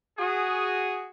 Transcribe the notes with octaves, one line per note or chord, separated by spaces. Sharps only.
F#4 G#4